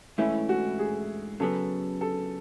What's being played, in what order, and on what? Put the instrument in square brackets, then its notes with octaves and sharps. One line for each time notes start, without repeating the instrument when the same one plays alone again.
[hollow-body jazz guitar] G#2 E3 A3 C#4 [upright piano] E4
[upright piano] F#4
G#4
[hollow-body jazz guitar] C#3 F#3 B3 [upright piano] A4
[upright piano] A4